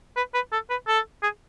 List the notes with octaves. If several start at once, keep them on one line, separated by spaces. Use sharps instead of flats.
B4
B4
A4
B4
A4
G#4